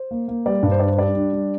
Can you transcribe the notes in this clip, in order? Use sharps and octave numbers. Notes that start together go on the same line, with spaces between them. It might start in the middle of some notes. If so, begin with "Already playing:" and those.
Already playing: C5
A#3
A#3
G3 D5
G2
C5
D4 D5
C5
G3 D5
D4
G3